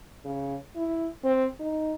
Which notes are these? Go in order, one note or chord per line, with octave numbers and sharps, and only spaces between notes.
C#3
E4
C4
D#4